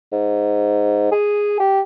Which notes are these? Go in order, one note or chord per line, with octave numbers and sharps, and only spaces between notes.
G#2
G#4
G4